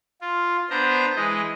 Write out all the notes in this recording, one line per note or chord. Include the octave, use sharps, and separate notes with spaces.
F4
B3 D4 C5 A#5
E3 G#3 D#5